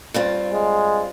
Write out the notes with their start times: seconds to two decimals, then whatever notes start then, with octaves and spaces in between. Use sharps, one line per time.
0.14 G2 C4 F4
0.52 G#3